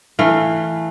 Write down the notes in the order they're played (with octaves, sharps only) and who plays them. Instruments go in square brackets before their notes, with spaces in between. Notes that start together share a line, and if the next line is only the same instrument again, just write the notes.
[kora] E3 A3 F5